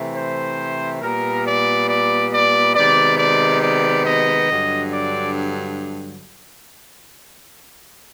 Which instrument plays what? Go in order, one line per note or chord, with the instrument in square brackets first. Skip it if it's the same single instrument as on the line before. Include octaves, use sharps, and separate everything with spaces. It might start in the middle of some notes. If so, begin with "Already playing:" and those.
Already playing: [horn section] C3 E3 A3
C5
A#2 G3 B3 A#4
D5
D5
D5
C3 D#3 G#3 B3 D5
D5
D5
D#5
G2 D3 F#3
D5